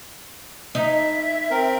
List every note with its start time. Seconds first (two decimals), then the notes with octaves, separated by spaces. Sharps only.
0.75 D#4 E5
1.51 C4 A#4